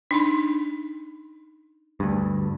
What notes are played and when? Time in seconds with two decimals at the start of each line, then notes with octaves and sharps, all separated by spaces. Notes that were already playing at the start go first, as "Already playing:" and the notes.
0.11 D4 D#4 B5
2.00 D2 G2